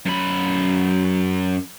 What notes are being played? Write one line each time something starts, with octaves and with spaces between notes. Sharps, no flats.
F#2 B5